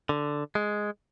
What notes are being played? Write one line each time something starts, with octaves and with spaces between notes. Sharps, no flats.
D3
G#3